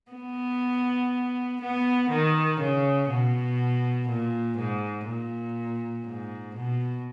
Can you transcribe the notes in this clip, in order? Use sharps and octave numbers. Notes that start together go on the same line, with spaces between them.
B3
B3
D#3
C#3
B2
A#2
G#2
A#2
G#2
B2